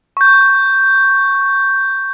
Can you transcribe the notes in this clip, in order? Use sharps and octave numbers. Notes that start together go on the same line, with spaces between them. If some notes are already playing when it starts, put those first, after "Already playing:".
C#6 G6